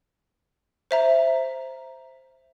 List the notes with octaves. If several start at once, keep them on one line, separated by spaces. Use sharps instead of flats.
C5 E5 A#5